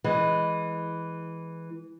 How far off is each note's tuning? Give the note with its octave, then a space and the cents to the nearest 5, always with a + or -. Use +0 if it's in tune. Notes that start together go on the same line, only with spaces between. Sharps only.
E3 +0 G#3 +0